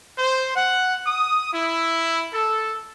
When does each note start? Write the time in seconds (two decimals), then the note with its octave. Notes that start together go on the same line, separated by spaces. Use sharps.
0.18 C5
0.55 F#5
1.06 D#6
1.53 E4
2.34 A4